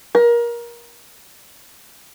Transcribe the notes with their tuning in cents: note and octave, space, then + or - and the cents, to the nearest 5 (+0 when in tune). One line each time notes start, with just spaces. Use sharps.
A#4 +25